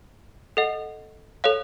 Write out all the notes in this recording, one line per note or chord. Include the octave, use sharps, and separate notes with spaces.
A4 D#5 F#5
A4 C#5 F5